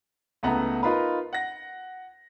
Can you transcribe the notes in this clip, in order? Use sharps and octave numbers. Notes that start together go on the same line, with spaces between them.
C#2 A3 B3 E4 F#5 A#5
D#4 F4 A#4 B4
F#5 A#6